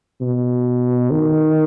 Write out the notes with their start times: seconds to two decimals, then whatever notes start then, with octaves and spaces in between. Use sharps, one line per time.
0.21 B2
1.11 D#3